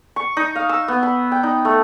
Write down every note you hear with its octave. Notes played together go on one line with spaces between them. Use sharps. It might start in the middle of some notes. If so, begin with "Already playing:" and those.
C#6
D#4
F5
E6
B3
B5
G5
D#4
A3